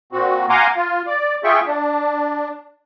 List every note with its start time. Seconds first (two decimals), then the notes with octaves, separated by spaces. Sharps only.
0.12 A#2 C4 F#4
0.50 F5 F#5 G#5 A#5 C6 D6
0.76 F4
1.07 D5
1.44 F4 G#4 E5 G5 C#6
1.67 D4